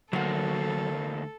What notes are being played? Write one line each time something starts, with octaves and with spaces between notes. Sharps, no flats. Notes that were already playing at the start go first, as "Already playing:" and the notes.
D2 F#3 A#3 F#4 A4